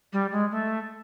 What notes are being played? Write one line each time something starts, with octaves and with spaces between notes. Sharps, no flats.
G3
G#3
A3